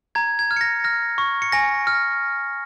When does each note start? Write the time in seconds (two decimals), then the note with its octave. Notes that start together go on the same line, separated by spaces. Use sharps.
0.15 A#5 G#6
0.39 G#6
0.51 F6
0.56 C#7
0.61 A#6
0.84 F6 A#6
1.18 C#6
1.42 C#7
1.52 G#5 A#6
1.87 F6